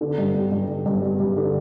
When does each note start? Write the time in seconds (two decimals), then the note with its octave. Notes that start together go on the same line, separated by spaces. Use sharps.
0.01 D3
0.18 G2
0.34 G3
0.52 G2
0.69 D3
0.86 G2
1.02 G3
1.20 G2
1.37 D3